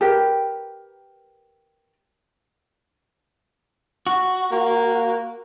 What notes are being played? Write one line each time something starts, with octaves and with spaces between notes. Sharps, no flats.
G4 A#4 B4 G5
F#4
A#3